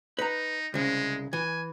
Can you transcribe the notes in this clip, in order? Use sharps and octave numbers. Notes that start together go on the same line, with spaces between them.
D#4 B4 A#5
C2 C#3 G#3
E3 G#5